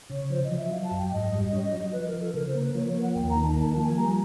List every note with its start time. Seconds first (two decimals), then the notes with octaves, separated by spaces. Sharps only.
0.10 C#3 C#5
0.30 F3 C5
0.44 D#5
0.51 F3
0.57 E5
0.71 F#3 F5
0.84 A5
0.91 F#2
0.98 G5
1.12 G#2 D#5
1.32 G3
1.53 C#4
1.73 F#3
1.93 F3 B4
2.07 A#4
2.13 F3
2.20 A4
2.33 C#3 A#4
2.47 C5
2.54 A#3
2.61 B4
2.74 F3 C#5
2.88 C#5
2.94 A#3
3.02 F#5
3.15 D#2 G5
3.29 A#5
3.35 D#3
3.43 A5
3.55 A#3 A5
3.69 A5
3.76 F3
3.83 G#5
3.97 G3 A#5